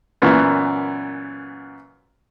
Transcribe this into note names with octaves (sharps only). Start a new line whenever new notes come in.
F#2 A#2 E3 B3